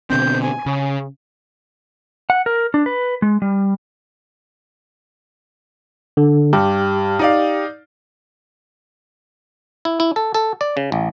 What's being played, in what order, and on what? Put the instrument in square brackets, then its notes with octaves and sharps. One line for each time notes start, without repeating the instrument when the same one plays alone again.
[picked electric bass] B2 D3 C4 [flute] G6
[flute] G#5
[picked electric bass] C#3
[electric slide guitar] F#5
A#4
D4
B4
G#3
G3
[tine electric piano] D3
[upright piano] G2 [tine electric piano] G4
[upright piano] D#4 D5 F5
[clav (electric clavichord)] E4
E4
A4
A4
D5
C#3
A1